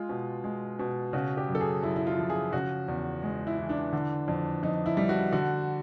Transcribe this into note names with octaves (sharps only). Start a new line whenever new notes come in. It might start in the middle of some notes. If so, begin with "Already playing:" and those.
Already playing: G#3 F4
B2
G#3
B2
C#3 F#4
G4
F#2
A4
G#4
F#2 E4
E4
F4
F3
G#4
C#3 F#4
E2
G#3
E4
E3
D4
D3
F2
F2 D#4
E4
G3
F#4
D3 F#4